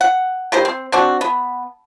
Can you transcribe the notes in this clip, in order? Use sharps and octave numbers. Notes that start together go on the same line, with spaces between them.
F#5
D#3 G3 C5
C4
C4 D4 F#4
B3